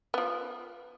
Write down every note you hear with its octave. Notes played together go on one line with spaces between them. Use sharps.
F3 B3